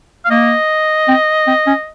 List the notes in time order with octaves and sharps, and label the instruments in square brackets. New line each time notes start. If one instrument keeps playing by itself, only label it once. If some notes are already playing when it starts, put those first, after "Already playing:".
[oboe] F5
[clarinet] A#3 [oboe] D#5
[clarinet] C4
C4
C#4